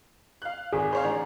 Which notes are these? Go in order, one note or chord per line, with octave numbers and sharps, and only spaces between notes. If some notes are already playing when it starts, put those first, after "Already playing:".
F5 F#6
G#1 G#4
C5 C#5 F5
A1 D4 A#5